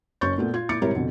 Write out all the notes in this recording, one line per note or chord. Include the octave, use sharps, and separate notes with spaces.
F#1 C#4 C#6 G6 A6
A#2 A3 B3
F4 G#6
A#2 E4 D6 A6 C#7
G#1 C3 G3 E4 A#4 C#5
F2 B2 D3